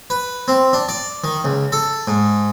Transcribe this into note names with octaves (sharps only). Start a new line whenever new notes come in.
B4
C4
D4
D5
D#3
C#2
A4
G#2